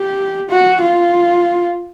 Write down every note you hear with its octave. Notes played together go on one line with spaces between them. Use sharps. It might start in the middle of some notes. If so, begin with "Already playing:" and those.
Already playing: G4
F#4
F4